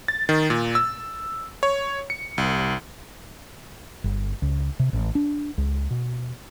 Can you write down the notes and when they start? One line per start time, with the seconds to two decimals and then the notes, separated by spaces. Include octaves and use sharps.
0.08 A6
0.29 D#3
0.50 A#2
0.75 E6
1.63 C#5
2.10 C#7
2.38 C2
4.04 G1
4.42 C#2
4.79 C3
4.93 A1
5.15 D4
5.58 C#2
5.90 B2